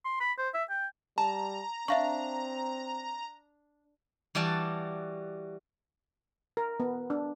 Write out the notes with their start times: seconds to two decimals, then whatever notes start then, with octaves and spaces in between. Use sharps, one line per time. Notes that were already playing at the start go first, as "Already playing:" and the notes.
0.05 C6
0.21 B5
0.38 C5
0.54 E5
0.70 G5
1.18 G3 A5 A#5
1.88 C4 D4 E5 F5 C#6
4.35 E3 G3 F#4 D5 A5
6.57 A#4
6.80 B3
7.10 D4